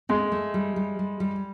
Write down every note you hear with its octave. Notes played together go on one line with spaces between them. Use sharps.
G#3 A3
A3
G3
G3
G3
G3